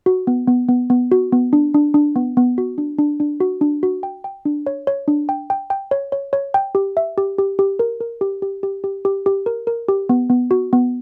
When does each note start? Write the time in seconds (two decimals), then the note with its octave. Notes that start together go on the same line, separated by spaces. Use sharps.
0.06 F#4
0.27 B3
0.48 B3
0.69 B3
0.90 B3
1.12 F#4
1.32 B3
1.53 D4
1.74 D4
1.94 D4
2.16 B3
2.37 B3
2.58 F#4
2.78 D4
2.98 D4
3.20 D4
3.40 F#4
3.61 D4
3.83 F#4
4.03 G5
4.24 G5
4.45 D4
4.67 C#5
4.87 C#5
5.08 D4
5.29 G5
5.50 G5
5.70 G5
5.91 C#5
6.12 C#5
6.33 C#5
6.54 G5
6.75 G4
6.97 E5
7.18 G4
7.38 G4
7.59 G4
7.79 A#4
8.01 A#4
8.21 G4
8.42 G4
8.63 G4
8.84 G4
9.05 G4
9.26 G4
9.46 A#4
9.67 A#4
9.88 G4
10.09 B3
10.30 B3
10.51 F#4
10.73 B3